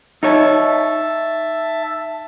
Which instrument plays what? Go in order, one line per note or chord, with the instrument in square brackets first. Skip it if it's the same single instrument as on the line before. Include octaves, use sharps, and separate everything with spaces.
[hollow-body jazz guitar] D#4 C#5 [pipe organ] E5 A5